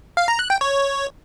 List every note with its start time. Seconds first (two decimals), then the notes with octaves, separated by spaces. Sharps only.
0.17 F5
0.28 A#5
0.39 F#6
0.50 G5
0.61 C#5